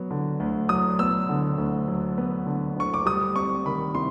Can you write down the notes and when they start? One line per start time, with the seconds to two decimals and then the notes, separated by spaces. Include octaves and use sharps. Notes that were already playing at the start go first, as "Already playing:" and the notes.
Already playing: F#3 B3
0.11 D3
0.40 D2
0.69 F#3 D#6
0.99 B3 E6
1.29 D3
1.58 D2
1.88 F#3
2.18 B3
2.46 D3
2.76 D2 C#6
2.94 D6
3.06 G3 D#6
3.35 C4 C#6
3.66 D#3 B5
3.95 C3 C6